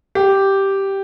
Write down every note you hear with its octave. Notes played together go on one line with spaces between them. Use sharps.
G4